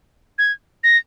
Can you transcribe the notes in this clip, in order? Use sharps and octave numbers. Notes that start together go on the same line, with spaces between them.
G#6
A#6